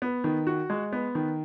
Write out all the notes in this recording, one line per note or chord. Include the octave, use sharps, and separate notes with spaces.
B3
D#3
F#4
G#3
B3
D#3